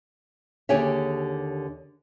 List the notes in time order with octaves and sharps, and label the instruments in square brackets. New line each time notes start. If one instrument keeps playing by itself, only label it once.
[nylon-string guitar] D#2 D3 G4 G#4 C#5 E5